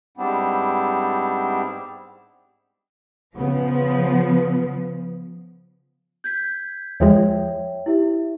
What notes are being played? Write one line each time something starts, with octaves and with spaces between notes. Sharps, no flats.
G#2 G3 B3 C4 D4 E4
C#3 F3 B3
G6 G#6 B6
E2 F3 G#3 C#5 E5 G5
E4 G4 E5